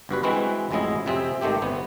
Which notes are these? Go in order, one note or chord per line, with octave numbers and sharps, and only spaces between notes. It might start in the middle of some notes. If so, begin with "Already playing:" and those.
G1 G2 F#4 B4
E3 G#3 C4 F#4 B4
A1 F2 F#3 G#3 E4 D#5
F2 C3 C4 G#4 E5
G#1 D#3 A3 C4 G4
G1 C3 B3